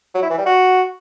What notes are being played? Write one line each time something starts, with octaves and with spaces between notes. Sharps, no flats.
F#3
E4
E3
G3
F#4